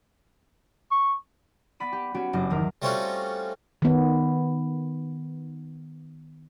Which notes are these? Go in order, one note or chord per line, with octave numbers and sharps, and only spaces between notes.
C#6
B3 D5 B5 D#7
G4
B3 C#4 F#4 G4 D7
F#1 G2 G4 D6 A#6
E2 D#3 A#4
G3 A3 C4 C#4 F4 F#4
D#3 B3